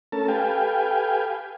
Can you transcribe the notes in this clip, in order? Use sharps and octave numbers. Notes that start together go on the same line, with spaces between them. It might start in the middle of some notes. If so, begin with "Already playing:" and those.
A3 C#4 A4 A#4 A5
G4 A4 B4 F5 G5 G#5